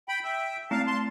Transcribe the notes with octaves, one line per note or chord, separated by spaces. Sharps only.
G5 B5
E5 G5
A3 C4 E4 F5 A5
A5 C6